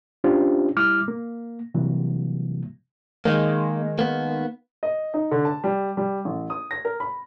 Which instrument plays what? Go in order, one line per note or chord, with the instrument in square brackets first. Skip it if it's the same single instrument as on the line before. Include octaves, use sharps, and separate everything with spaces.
[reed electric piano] C#4 D4 F4 G4 C5
G3 E4 D6 F6
A#3
C3 E3 F#3 G3 A#3
[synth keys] D#3 G#3 [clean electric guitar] A#3
[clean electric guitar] A#3 B3
[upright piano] D#5
D#4
D3
A5
G3
G3
A1
D#6
A#6
A#4
B5